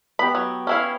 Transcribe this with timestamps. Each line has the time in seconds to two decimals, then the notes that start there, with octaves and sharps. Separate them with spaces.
0.19 B3 G4 B5
0.35 F#3
0.67 C#4 E4 F5